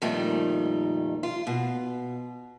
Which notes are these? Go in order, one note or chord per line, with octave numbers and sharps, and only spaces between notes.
F2 A#2 D#3 G3 A3 D#4
F4
B2